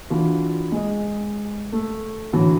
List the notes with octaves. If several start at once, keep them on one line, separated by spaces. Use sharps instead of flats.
E3 D4 F4 F#4
G#3 D#5
A3
A2 D3 E3 F#3